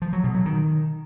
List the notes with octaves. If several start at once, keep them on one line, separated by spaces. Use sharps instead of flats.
F3
F#3
B2
F#3
D#3